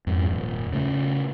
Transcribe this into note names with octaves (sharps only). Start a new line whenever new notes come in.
F2 G#2
D#1
C#3 A3